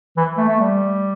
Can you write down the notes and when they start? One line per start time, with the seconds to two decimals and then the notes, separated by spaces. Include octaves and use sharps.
0.17 E3
0.37 A3
0.48 A3
0.60 G3